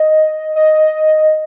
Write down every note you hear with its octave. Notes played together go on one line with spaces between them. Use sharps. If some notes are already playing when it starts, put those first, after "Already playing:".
Already playing: D#5
D#5